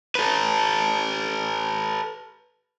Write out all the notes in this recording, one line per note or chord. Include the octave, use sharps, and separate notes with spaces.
A4 B4